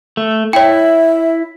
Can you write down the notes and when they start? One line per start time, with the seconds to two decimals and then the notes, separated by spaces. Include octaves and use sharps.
0.17 A3
0.53 E4 C#5 E5 G5